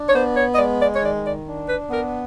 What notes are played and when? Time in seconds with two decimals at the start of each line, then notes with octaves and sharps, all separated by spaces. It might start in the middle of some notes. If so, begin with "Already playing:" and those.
Already playing: D4
0.08 C#5
0.13 B3 C5
0.36 C#5
0.54 D#5
0.58 G#3 D5
0.79 D5
0.94 C#5
1.02 D#3 D5
1.24 D5
1.47 D4
1.68 B4
1.90 B3 A#4